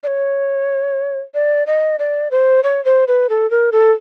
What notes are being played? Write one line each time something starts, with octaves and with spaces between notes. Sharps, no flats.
D5
C#5
D5
D#5
D5
C5
C#5
C5
B4
A4
A#4
A4